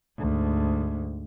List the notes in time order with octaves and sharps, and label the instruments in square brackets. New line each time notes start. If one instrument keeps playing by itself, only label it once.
[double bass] D2 G#2